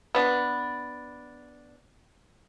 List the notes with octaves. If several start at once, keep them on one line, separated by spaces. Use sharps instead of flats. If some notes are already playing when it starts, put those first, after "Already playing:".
B3 D4